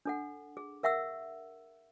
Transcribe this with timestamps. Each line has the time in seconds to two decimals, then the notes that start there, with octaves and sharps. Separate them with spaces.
0.05 D4 A4 F#5
0.57 G#4
0.83 A#4 E5 F#5 C#6 E6